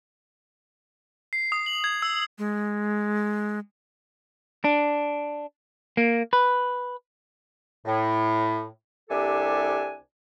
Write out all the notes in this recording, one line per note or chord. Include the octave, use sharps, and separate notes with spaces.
C7
D#6
F#7
G#6
E6
G#3
D4
A#3
B4
A2
C2 C3 D4 G4 A4 G#5